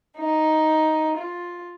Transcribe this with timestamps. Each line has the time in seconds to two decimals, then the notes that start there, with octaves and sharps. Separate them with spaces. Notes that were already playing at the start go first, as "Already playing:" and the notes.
0.18 D#4
1.17 F4